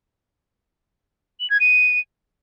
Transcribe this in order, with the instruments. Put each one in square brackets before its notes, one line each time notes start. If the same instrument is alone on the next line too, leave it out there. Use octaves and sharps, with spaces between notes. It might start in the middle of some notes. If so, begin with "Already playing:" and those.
[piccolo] F#7
G#6
D#7